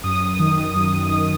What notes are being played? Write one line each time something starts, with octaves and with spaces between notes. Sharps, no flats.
F#2 D#6
D#3
F#2
D#3